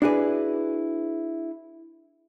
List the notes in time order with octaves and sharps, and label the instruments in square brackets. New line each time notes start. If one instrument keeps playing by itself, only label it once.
[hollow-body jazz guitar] D4 E4 F#4 G#4 B4